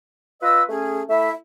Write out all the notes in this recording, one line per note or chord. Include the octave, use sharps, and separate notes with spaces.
F4 B4 D#5 E6
A3 C#4 G#4
A3 E4 E5